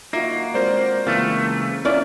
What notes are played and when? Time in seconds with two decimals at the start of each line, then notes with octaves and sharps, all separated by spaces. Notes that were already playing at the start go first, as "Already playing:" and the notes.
0.13 A#3 D#4 F4 F#4 E5
0.54 G#3 C4 F#4 A#4 C5 D5
1.07 C#2 E3 A3 A#3 C4 F4
1.85 B3 C#4 E4 F4 A#4 D5